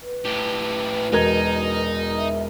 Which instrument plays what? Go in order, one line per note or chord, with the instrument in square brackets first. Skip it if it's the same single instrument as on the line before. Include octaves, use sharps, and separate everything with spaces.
[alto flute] B4
[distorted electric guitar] A2 G4
[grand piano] E1 A#4 G#6 [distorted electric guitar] D#4
[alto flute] E5